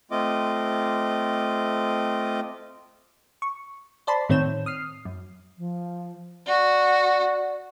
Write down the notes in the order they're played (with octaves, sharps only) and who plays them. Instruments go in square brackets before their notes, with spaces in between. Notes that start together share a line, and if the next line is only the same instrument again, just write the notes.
[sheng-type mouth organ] A3 C4 F4 D#5 D6
[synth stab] C#6
C5 D5 A5 B5 C6
A2 D#3 C4 C#5 G6 E7
D#6 F6 C7
F#2
[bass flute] F3
[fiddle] F#4 [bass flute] D5